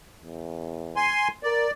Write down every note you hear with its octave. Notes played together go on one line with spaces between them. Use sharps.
E2
G#5 C6
A#4 D5